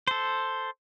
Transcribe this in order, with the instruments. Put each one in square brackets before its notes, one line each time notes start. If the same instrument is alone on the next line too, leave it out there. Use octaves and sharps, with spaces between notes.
[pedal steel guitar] A4 C5